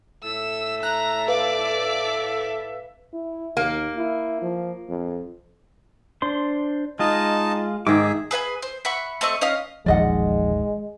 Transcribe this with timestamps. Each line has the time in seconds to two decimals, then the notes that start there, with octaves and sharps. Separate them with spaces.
0.24 A2 A4 E5 E6
0.83 A#5 F#6
1.28 B4 D5 F5 D6
3.13 E4
3.57 D#2 A#3
3.97 E4
4.42 F3
4.89 F2
6.22 D4 C5 C6
6.99 G#3 D#4 F4 D#5 A5
7.87 G#2 D#3 G#4 D#5 E5 D6
8.31 G#4 B4 F5 G#5
8.62 C5
8.85 E5 F#5 B5 C#6
9.21 A3 C4 D#5 C#6
9.41 C#4 D#5 F5 D#6
9.86 E1 A#1 D#3 F3 G#3 D5 D#5 F#5